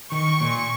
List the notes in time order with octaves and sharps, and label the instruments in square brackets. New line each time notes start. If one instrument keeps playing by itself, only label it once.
[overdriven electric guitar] D#3 [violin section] C#6
[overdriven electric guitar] A#2